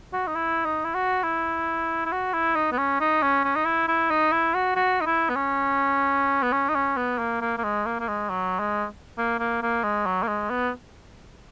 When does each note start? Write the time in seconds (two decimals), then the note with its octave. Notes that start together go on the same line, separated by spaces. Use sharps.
0.13 F#4
0.27 D#4
0.36 E4
0.65 D#4
0.85 E4
0.94 F#4
1.23 E4
2.05 E4
2.12 F#4
2.33 E4
2.56 D#4
2.72 B3
2.78 C#4
3.00 D#4
3.22 C#4
3.44 C#4
3.55 D#4
3.66 E4
3.88 E4
4.10 D#4
4.32 E4
4.54 F#4
4.76 F#4
5.01 D#4
5.06 E4
5.29 B3
5.36 C#4
6.43 B3
6.52 C#4
6.69 D#4
6.75 C#4
6.97 B3
7.19 A#3
7.41 A#3
7.58 A#3
7.64 G#3
7.85 A#3
8.00 A#3
8.08 G#3
8.30 F#3
8.59 G#3
9.18 A#3
9.39 A#3
9.62 A#3
9.83 G#3
10.06 F#3
10.23 A#3
10.27 G#3
10.50 B3